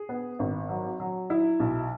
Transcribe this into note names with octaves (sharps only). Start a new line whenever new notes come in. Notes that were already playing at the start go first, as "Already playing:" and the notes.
Already playing: G#4
B3
G#1
F#3
F#3
E4
B1